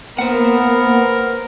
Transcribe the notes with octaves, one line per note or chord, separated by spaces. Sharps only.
A#3 B3 A#4 C5 F#5